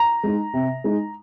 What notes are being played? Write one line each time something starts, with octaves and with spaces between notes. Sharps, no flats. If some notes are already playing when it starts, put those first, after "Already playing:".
Already playing: A#5
G#3 D#4
C3
G#3 D#4